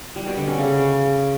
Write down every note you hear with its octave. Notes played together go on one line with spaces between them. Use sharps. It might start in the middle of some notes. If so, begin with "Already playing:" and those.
G3
B2
D3
C#4
C#3